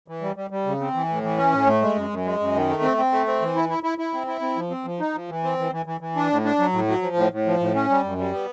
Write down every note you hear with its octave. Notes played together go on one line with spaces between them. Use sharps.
E3
G3
G3
G3
C#3
C4
E3
A2
E3
C#4
A2
A3
G#3
F#2
F#2
G#3
F#2
D#3
A3
C4
C4
A3
C4
E3
E4
E4
E4
E4
C4
E4
C4
F3
C4
F3
D#4
F3
E3
C4
E3
E3
E3
E3
D4
A2
D4
F#3
A2
F#3
F3
A2
A2
F3
A2
C#4
G3
F#2
G3
B3